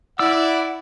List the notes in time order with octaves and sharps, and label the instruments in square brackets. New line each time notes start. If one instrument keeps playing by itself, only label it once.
[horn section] E4 [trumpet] D5 [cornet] F#5 [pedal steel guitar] E6